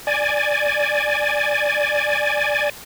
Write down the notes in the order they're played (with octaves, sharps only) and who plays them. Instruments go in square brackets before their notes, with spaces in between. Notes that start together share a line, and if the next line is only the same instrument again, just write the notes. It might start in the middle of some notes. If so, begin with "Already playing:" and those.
[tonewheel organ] D5 G#5